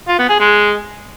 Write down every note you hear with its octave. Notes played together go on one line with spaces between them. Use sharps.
F4
B3
G#4
G#3